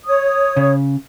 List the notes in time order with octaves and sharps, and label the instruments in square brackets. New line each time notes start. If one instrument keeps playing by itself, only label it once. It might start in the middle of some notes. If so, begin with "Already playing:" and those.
[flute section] C#5 D#6
[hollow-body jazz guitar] C#3